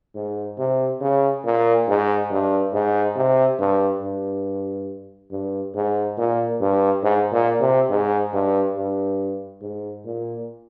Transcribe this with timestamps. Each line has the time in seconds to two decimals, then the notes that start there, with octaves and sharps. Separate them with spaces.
0.15 G#2
0.58 C3
1.01 C#3
1.44 A#2
1.88 G#2
2.30 G2
2.73 G#2
3.16 C3
3.59 G2
4.02 G2
5.31 G2
5.75 G#2
6.17 A#2
6.60 G2
7.03 G#2
7.31 A#2
7.61 C3
7.89 G#2
8.33 G2
8.75 G2
9.61 G#2
10.05 A#2